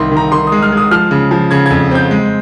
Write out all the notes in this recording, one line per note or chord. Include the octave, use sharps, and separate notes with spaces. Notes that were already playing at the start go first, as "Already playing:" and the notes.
Already playing: C2 D#3 C6
D#3 A#5
D#3 C6
D#6
G#3
F6
G#3
D#6
F3 F6
C#3
F3
C#3 G#6
G#6
F2
C4 G6
G#3